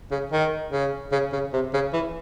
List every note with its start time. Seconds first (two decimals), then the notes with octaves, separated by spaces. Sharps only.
0.11 C#3
0.32 D#3
0.72 C#3
1.12 C#3
1.33 C#3
1.53 C3
1.73 C#3
1.93 E3